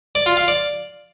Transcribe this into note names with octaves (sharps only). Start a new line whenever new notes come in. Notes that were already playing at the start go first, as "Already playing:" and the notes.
D5
F4
F5
D5